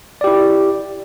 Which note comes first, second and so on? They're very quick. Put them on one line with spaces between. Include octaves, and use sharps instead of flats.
D5 G4 E4